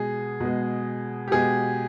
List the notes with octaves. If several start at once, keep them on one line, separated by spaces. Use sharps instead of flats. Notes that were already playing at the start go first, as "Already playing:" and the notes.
Already playing: B2 G#3 G#4
B2 G#3
G4
B2 G#3 G#4